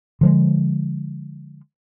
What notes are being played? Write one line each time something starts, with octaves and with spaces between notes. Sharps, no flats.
D3 F3 G#3